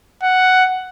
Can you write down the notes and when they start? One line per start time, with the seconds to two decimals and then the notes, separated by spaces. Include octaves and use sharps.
0.23 F#5